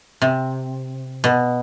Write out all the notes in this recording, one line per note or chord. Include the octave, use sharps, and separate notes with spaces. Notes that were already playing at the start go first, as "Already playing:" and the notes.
C3
B2